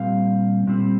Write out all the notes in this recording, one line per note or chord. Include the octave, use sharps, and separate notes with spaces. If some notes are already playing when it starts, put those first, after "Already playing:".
Already playing: A#2 G3 C4 F5
A#2 G3 C4